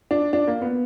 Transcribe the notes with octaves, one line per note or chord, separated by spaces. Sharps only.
D4
D4
A#3
B3